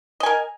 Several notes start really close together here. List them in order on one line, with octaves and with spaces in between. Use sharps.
D#5 G#5 A#4